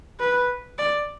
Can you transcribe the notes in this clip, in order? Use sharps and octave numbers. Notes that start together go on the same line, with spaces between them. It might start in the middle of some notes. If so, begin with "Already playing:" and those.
B4
D5